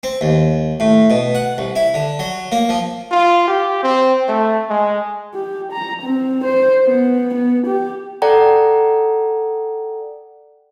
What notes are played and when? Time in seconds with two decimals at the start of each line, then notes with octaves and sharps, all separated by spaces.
0.03 C4
0.21 D#2
0.80 A2
1.10 B2
1.35 F#5
1.58 C2
1.76 E4
1.94 D3
2.19 F#3
2.52 A#3
2.69 F3
3.12 F4
3.48 G4
3.83 C4
4.28 A3
4.70 G#3
5.34 G4
5.73 A#5
6.03 C4
6.45 C5
6.87 B3
7.34 B3
7.67 G4
8.22 A4 D5 F#5 G5 A#5